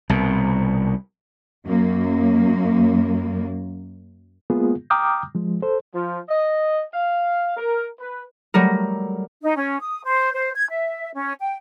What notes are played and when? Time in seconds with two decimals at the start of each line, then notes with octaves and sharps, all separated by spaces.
0.10 C2 B2
1.66 F#2 A#3
4.50 G#3 A#3 B3 F4 G#4
4.90 G5 A#5 D6 D#6 F6 G6
5.35 F3 G#3
5.62 A4 C5
5.94 F3
6.29 D#5
6.94 F5
7.56 A#4
8.00 B4
8.54 F#3 G3 A3 A#4
9.42 D#4
9.56 C#4
9.81 D#6
10.03 C5
10.33 C5
10.55 G#6
10.68 E5
11.14 C#4
11.39 G5